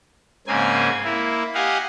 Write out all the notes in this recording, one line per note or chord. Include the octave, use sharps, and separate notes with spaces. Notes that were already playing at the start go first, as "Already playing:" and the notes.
G#2 C#3 A#3 C4 G#5
A#3 E4
G4 D#5 F5 F#5 G#5